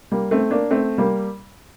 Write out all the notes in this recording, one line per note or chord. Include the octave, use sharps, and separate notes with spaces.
G3 A#3
A3 C4
A#3 D4
A3 C4
G3 A#3